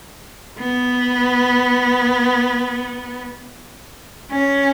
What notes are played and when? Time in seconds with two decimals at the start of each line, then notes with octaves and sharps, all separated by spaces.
0.59 B3
4.32 C#4